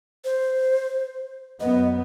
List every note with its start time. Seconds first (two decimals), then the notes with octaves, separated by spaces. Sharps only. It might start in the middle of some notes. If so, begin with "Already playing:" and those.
0.25 C5
1.60 F#2 B3 D#5